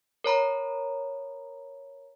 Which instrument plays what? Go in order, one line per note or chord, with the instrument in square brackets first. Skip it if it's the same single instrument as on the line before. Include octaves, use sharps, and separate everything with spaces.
[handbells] A#4 C#5 A#5 B5